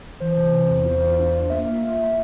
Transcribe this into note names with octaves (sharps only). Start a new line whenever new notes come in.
E3 C5
C3
C3
E2
F4
F4
D4
F4
A#3 E5
F4
A#3
A#3